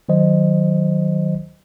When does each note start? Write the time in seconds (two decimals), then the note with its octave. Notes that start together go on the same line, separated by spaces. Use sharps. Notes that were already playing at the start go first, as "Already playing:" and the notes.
0.09 D#3 F#3 C5 D#5